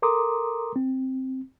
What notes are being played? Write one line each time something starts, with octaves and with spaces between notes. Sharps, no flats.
A4 A#4 A#5 C6 D6 D#6
C4